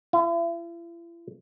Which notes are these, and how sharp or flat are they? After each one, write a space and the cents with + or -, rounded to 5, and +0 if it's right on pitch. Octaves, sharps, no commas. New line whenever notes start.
E4 +45